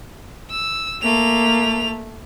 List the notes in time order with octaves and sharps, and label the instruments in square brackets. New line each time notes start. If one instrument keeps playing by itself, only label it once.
[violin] E6
[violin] A3 F7 [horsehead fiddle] A#3